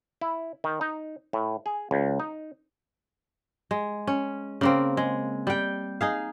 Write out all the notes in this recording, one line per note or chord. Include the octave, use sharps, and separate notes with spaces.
E4
D#3
D#4
A2
G#4
C#2
D#4
G#3
C#4
C#3 A#3 C4
G#3
G3 G5
D#4 G#4 F5